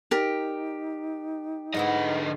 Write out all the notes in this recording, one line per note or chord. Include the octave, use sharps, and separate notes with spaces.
D#4 G4 A#4 D5
G#2 D3 B3 E4 D#5